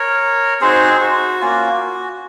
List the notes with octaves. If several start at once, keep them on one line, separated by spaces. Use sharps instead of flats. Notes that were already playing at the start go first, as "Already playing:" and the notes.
Already playing: A#4 C#5
C4 D#4 F#4 G#4 C5
F#4
A#3 C#4 F4